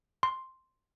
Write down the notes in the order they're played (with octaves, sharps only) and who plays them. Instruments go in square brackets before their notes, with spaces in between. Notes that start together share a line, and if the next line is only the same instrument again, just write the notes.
[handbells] C6